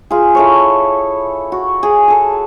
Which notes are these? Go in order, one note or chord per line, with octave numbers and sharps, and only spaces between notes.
F4 G#4
E4 A4 C#5
F#4
G#4
G#4 A4